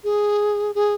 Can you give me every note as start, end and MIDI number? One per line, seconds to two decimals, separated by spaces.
0.04 0.71 68
0.75 0.94 68